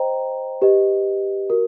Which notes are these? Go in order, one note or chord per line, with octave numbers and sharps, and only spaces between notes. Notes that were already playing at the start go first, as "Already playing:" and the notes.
Already playing: C5 D#5 G5 A#5
G4 B4 D#5
F#4 A#4